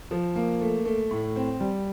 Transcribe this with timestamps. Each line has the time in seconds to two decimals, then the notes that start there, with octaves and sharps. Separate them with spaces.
0.11 F3
0.36 A#3
0.61 A3
0.85 A3
1.11 A2
1.36 C4
1.60 G3